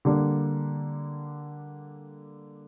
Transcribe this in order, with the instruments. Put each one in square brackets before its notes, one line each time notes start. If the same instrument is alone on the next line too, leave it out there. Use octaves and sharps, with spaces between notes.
[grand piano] D3 G3 A#3 D4